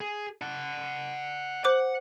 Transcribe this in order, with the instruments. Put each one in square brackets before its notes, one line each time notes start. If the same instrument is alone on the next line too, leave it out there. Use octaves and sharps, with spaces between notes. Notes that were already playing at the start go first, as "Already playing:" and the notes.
[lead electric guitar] G#4
F#5 A5
[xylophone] C5 D6 F#6 [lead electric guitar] F#5